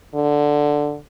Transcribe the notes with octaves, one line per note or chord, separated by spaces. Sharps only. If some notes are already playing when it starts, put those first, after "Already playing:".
D3